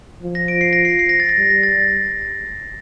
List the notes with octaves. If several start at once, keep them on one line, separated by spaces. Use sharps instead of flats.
F3
A#6
D7
C7
A#6
C7
C7
A#6
A6
A#6
G3
A#6
A6